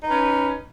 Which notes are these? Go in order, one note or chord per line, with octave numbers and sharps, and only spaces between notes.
C#4 D#4 B4